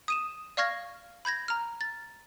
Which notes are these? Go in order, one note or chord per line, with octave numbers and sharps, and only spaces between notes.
D#6 D#7 E7
D5 F5 C#6 F6 G#6 A#6
B5 G6 G#6 A#6
A#5 F6
A6